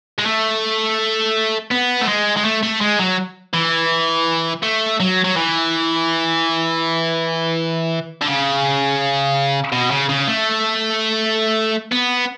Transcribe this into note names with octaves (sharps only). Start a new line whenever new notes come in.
G#3
A3
B3
A3
G#3
G#3
A3
A3
G#3
F#3
E3
A3
F#3
F#3
E3
D3
C#3
B2
C#3
C#3
A3
B3